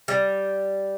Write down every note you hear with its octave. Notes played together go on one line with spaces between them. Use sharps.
G3